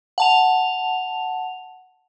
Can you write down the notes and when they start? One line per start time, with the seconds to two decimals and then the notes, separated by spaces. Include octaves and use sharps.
0.18 F#5 A5 F7